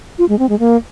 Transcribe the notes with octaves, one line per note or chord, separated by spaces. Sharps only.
F4
G#3
C4
G#3
A#3